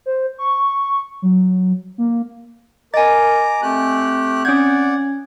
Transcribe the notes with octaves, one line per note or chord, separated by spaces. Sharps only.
C5
C#6
F#3
A#3
A#4 D#5 G#5 A#5 D6 A6
A3 C4 G4 F#6
C#4 D5 F#5 G6 G#6